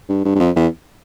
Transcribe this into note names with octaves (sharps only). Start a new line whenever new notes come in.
G2
G2
G2
F2
E2